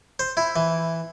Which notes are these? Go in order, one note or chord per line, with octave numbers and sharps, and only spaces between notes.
C5
E4
E3